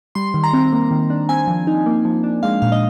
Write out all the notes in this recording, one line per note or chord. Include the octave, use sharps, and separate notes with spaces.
G3 C6
D#3
A#5
C4
A#3
D#3
D4
C4 G#5
F3
D#4
A#3
F3
D4
G#3 F5
A#2 F5
D#5